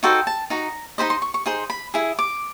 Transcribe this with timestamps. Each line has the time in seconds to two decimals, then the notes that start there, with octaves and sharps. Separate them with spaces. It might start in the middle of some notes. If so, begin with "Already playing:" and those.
0.03 D#4 F#4 A4 C5 G5
0.27 A5
0.50 D#4 F#4 A#5
0.98 D#4 G#4 C5 D#5 B5
1.10 C6
1.22 C#6
1.34 C#6
1.46 D#4 G#4 C5 C6
1.70 B5
1.94 E4 G#4
2.19 D6